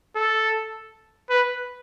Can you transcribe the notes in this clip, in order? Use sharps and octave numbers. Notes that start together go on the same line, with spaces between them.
A4
B4